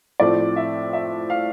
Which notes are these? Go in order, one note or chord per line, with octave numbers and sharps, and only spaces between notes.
A2 F3 A3 C4 D5
E5
E5
F5